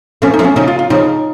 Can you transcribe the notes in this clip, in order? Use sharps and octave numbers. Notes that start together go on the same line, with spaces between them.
F3 A3 C#4
D#4
F3 A3
C#4
C#3 F3 D#4
F4
F4
C#3 F3 D#4